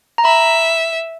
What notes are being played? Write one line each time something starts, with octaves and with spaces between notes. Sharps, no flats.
A#5
E5 B5